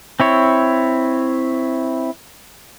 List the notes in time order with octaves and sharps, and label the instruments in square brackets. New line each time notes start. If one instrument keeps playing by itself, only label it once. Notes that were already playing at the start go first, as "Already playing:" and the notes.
[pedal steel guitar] C4 E4 C#5